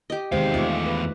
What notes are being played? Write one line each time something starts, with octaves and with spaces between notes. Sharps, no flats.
G4 D#5
E2 C3 D#3 G#3 C5 F5
A3 F4 D5 E5 C#6
B4